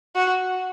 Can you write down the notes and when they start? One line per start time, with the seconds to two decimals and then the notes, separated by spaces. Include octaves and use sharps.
0.16 F#4